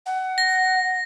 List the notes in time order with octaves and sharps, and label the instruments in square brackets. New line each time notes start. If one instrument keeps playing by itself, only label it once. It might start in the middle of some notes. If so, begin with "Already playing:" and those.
[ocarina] F#5
[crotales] A#6